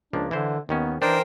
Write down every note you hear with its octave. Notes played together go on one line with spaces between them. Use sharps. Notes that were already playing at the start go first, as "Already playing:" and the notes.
C#2 F3 A#3 D4
D3 E3 E4 C5
D#2 D#3 B3 C#4
E3 D4 D#4 A#4 C5 G5